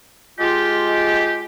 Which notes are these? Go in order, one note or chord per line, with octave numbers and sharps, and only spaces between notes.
G#3 F4 G4